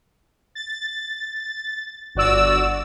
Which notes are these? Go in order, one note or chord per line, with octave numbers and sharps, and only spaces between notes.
A6
G1 F#4 D5 E6